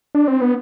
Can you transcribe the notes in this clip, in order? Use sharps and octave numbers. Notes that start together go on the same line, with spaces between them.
D4
C4
B3